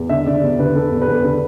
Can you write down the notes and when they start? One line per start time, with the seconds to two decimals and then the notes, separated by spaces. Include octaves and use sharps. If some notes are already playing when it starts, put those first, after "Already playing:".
Already playing: E2
0.09 D3 E5
0.26 D3 D5
0.43 E2
0.59 D3 B4
0.75 D3 A4
0.91 E2
1.02 B4
1.08 E2 A4
1.23 D3 B4